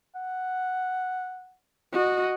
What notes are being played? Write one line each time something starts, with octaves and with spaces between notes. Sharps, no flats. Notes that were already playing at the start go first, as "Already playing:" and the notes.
F#5
F#4 D#5